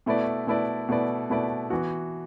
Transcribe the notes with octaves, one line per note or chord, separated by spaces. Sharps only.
B2 A3 E4 B4 D5
B2 A3 E4 B4 D5
B2 A3 E4 B4 D5
B2 A3 E4 B4 D5
E3 B3 F#4